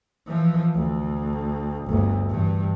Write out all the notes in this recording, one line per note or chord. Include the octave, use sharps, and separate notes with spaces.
E3 F3
D2
G1 D2
G2 E3